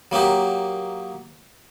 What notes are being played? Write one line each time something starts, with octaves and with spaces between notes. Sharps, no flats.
F#3 A#3 D#4 G4